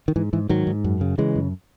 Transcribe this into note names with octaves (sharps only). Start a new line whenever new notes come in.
D#3
G#2 E3
G#2 E3
G#2 D#3 F#3
G#2
F#2
C#3
C#3 E3 G#3
F#2